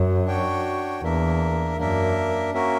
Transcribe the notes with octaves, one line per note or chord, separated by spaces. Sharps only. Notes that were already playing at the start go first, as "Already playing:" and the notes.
Already playing: F#2
D4 F#4 C#5 G5
E2 A#3 D4 A#4 E5
F#2 A#3 D4 A#4 E5
A#3 C#4 F#4 A#4 E5